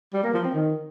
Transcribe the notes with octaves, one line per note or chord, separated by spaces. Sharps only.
G3
A#3
F3
C4
D#3